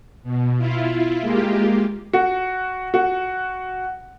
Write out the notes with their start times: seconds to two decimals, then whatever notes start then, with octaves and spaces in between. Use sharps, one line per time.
0.23 B2
0.57 E4 F4
1.21 G#3 A#3 F4 G4
2.13 F#4
2.94 F#4